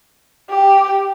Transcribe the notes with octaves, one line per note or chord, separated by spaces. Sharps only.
G4